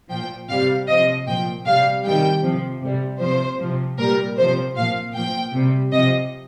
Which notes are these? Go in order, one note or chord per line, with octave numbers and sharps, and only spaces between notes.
A#2 F3 G5
C3 G3 F5
C3 F3 D#5
A#2 F3 G5
C3 G3 F5
C3 D#3 G3 G5
C3 F3
C3 G3
C3 F3 C5
C3 F3
A#2 G3 A#4
C3 F3 C5
A#2 F3 F5
A#2 F3 G5
C3 G3
C3 F3 D#5